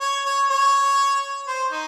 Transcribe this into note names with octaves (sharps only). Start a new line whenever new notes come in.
C#5
C#5
C#5
C5
D#4